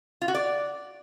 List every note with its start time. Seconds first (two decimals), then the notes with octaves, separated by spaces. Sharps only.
0.21 F4
0.28 F#4
0.35 D5